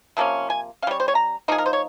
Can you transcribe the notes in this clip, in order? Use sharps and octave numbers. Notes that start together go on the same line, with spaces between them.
C3 F3 A#3 C#4
G#5
G3 C#4 C#5 F5
C5
C#5
A#5
F3 A#3 D#4 G#4
A#4
C5
C#5